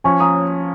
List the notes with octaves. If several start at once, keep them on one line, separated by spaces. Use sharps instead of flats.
F3 C#4 G#5 C#6
A#5 D#6